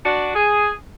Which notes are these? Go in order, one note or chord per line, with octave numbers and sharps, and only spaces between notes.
D4 F#4
G#4